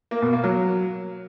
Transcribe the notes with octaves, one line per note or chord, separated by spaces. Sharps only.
A#3
B2
A#3
F#3